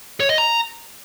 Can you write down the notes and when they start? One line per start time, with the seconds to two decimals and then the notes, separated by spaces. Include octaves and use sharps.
0.20 C#5
0.29 D#5
0.38 A#5